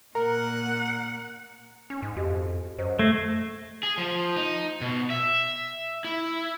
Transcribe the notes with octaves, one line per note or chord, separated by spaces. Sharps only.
A#2 A#4 F#5
C#4
G#2
F2 F#4 G4 D#5
F#2 C5 D#5
A3 G#6 A#6 C7
G#4
F3
D#4
B2
E5
E4